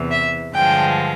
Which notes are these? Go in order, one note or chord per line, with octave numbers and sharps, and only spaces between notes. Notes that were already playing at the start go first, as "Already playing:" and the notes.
Already playing: E2 C3 E3
E5
G2 D3 F3 G#3 G5